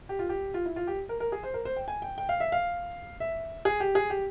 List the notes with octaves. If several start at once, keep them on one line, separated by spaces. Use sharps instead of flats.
G4
F4
G4
F4
E4
F4
G4
A#4
A#4
G#4
C5
A#4
C5
G5
G#5
G5
G5
F5
E5
F5
E5
G#4
G4
G#4
G4